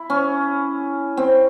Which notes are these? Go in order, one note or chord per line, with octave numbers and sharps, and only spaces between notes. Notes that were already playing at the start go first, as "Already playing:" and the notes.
Already playing: E4
C#4
C4